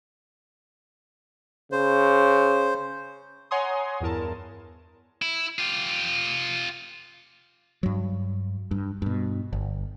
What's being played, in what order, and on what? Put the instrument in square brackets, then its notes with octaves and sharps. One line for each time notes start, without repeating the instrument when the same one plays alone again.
[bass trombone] C#3 [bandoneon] C5
[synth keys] C#5 F#5 G#5 A#5 C6 D#6
E2 G2 E4 A#4 A5
[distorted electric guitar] E4
F4 G4
[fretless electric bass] G2 F#3
G2
G2 B2
G1